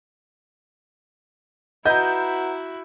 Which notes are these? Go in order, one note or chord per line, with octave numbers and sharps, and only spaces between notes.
E4 F#4 B4 D#5 F#5 A#5 G6